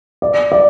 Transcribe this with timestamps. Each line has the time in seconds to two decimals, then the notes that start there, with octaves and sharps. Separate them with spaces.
0.22 D5
0.52 D5